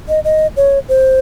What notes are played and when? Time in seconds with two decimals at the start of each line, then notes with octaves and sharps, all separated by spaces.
0.09 D#5
0.24 D#5
0.56 C#5
0.89 C5